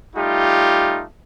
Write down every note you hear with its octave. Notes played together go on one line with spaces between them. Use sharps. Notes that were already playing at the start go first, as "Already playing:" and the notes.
G3 A3 D#4 F4 G4